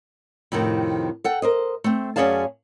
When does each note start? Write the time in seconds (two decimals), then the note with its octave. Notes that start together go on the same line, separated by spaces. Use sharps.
0.52 F2 A2 C3 D#3
1.24 A4 F#5 G5
1.42 A#4 C5 D#5
1.84 A3 C4
2.16 F#2 C#4 G#4 D5 F5 A5